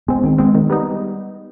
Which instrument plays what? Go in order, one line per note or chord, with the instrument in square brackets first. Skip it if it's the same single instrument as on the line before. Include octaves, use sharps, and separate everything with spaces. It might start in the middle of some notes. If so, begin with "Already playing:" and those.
[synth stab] G#3 C4 [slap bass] B3
[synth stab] D#3 [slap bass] C4
[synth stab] G#3 C4 [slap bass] B3
[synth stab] D#3
G3 B3 D#4